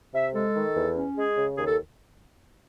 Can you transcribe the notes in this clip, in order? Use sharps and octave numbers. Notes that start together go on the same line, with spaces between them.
C3 E5
G#3 A4
D#3
E2
C#4
G#3 G#4
C#3
D#2 G#4
A4